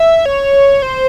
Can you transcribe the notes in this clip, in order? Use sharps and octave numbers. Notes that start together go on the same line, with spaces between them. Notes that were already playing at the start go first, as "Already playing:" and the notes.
Already playing: E5
C#5
C5